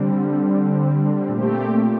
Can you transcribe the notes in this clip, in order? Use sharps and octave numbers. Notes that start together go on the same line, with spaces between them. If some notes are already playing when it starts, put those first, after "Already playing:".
Already playing: D3 G3 C4
A#2 A3 C4 G4